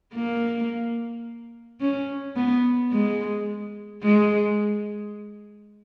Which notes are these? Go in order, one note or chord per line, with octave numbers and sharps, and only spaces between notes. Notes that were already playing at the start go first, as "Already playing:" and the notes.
A#3
C#4
B3
G#3
G#3